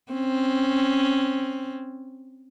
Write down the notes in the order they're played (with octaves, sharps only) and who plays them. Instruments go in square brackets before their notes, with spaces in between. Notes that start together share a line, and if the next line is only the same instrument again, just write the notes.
[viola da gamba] C4 C#4